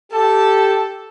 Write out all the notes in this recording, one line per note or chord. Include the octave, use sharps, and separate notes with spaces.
G4 A4 A5